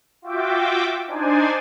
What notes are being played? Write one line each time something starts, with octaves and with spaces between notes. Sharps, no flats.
F4 F#4 E5 G5 D6
D4 D#4 C5 D5 G#5